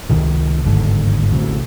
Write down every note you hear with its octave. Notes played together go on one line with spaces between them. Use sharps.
C#2 C3 D#3
G1 D#2 G#2 D3
A1 D2 C3